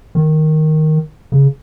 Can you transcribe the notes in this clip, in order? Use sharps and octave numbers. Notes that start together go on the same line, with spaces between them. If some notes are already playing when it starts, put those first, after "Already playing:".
D#3
C#3